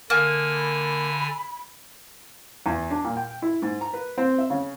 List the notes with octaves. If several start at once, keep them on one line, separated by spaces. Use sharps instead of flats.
D3 A#3 G#5
B5
E2
D4
A#2
G5
E4
G#2
A#5
B4
C4
E5
C#3